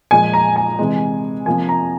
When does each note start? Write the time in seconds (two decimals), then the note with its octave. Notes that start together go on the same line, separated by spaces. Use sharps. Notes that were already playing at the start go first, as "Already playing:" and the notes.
0.11 A#2 F3 G#3 G#5
0.34 A#5
0.56 G#5
0.79 C3 E3 G#3
1.46 C3 F3 A#3 G#5
1.69 A#5